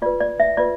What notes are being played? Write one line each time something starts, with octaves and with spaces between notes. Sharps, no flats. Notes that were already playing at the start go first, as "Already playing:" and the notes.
F4 B4 D5
D5
E5
F4 B4 D5